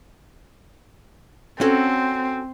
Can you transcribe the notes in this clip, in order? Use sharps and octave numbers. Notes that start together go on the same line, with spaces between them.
C4 C#4 F#4 A4